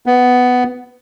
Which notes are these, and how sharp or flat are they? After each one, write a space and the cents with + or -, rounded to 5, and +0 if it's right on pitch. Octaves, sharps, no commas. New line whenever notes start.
B3 +10